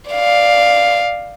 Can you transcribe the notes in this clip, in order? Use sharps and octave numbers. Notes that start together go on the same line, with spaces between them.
D5 F5